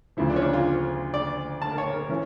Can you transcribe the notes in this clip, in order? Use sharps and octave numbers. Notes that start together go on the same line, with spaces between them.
D2 C#3 F3 E4
D4
C#4
D4
F4
D5
A5
A#4
C#5
A#4
E3 C#4